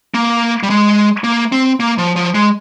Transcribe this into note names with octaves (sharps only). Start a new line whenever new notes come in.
A#3
G3
G#3
A#3
C4
A#3
F3
F3
G#3